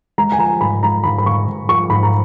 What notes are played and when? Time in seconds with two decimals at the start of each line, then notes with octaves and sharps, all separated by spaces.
0.18 G#3 A#5
0.32 G#5
0.39 F3 A#5
0.61 G#2 B5
0.83 G#3 A#5
1.04 G#2 B5
1.18 B5
1.26 G#2 C#6
1.48 G#2
1.68 F3 C#6
1.90 G#2 B5
2.03 A#5